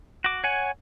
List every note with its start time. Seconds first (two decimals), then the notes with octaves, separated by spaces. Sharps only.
0.24 F#4 D6
0.44 C#5 F#5 G#5